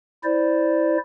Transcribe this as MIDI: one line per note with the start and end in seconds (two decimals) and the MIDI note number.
0.24 0.97 64
0.24 0.97 72
0.24 0.97 74